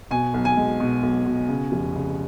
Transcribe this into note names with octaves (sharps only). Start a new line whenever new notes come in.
B2 G#5
B1
G#5
G#3
B2
B1
B2
C#3
F1
C#3